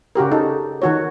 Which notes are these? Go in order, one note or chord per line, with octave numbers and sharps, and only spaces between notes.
C#3 F#4 G4 A#4
D#4 A4
D#3 F#4 C#5